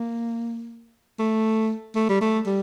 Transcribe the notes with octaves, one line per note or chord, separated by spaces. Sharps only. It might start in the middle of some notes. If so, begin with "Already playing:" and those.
Already playing: A#3
A3
A3
G3
A3
G3